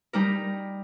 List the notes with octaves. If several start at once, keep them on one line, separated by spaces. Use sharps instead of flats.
G3 D#4 A#4